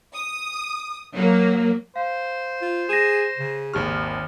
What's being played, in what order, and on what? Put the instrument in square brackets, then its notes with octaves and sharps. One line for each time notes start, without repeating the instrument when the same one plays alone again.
[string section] D#6
F#3 A#3
[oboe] C5 [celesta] F5
[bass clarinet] F4
[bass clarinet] G#4 [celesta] A#6 D#7 E7
[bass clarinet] C#3
[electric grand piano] G#1 D#2 F6 [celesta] G4